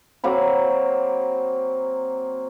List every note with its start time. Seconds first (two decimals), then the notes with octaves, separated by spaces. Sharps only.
0.24 F#3 A#3 C4 B5